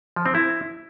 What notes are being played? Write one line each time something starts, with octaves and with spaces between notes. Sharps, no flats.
F3
C4
E4